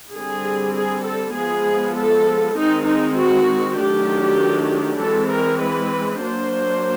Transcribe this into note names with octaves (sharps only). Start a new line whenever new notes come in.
D3 G3 C4 G#4
G#4
A4
F3 G#3 B3 G#4
A4
D#3 G#3 C4 D#4
D#4
F#4
D#3 F#3 A3 D4 G4
E3 G#3 C4 A4
A#4
B4
F#3 A#3 D4 C5